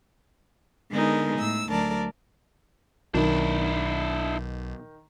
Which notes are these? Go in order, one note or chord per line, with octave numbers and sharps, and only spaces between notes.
D3 G#3 B3 D#4 G#4 A#4
A2 E6
D2 F#3 A#4 D5 A5
B1 D#3 D4 E4